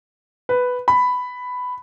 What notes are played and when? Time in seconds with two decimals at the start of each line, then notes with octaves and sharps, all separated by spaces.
0.49 B4
0.88 B5